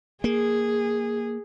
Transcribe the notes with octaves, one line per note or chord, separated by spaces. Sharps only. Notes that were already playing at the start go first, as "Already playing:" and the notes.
A#3 G#4